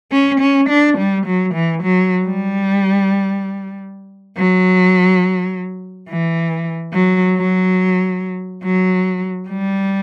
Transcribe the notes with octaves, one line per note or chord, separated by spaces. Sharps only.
C#4
C#4
D4
G3
F#3
E3
F#3
G3
F#3
E3
F#3
F#3
F#3
G3